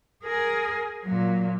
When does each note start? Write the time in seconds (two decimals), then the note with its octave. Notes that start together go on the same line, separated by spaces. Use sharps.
0.24 G#4 A#4
1.04 A#2 F#3